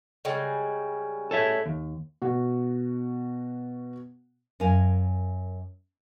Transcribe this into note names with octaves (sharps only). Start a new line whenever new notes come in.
C#3 G3 G#3
A4 C#5 E5
D#2
B2 F#4
F#2 A#4 F5 G#5